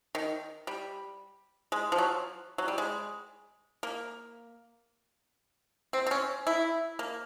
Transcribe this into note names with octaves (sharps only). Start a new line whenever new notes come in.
D#3
G3
G#3
F3
F#3
F#3
G3
G#3
A#3
C4
C4
C#4
E4
A#3